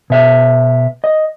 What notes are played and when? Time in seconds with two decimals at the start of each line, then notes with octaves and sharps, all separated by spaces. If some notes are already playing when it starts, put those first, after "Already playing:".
0.10 B2 E5 A5
1.04 D#5